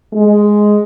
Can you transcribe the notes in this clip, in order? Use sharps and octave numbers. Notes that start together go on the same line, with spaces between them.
G#3